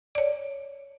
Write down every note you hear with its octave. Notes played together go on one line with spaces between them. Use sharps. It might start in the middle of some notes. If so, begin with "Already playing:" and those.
C#5 D5